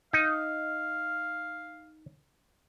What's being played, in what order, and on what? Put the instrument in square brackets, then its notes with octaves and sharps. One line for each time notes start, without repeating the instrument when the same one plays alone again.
[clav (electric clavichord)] D#4 [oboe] F5